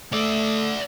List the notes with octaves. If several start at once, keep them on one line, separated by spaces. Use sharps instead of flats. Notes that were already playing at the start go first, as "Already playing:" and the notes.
A3 D5 E5